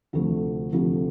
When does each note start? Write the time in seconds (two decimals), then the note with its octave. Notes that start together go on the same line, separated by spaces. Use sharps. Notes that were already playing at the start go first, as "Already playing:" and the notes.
0.13 D2 C3 F3 A3
0.73 D2 C3 F3 A3